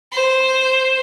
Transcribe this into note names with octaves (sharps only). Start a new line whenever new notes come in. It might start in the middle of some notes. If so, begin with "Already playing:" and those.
C5